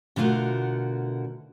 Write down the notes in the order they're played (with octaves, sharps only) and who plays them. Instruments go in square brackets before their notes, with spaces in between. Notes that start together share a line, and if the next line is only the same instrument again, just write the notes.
[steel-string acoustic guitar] B2 D3 A3 F4 F#4 A#4